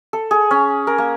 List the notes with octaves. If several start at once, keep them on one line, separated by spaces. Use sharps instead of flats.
A4
G#4
C#4
A#4
A#3